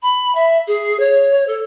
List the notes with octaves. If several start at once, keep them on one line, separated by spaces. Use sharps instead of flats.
B5
E5
G#4
C#5
A4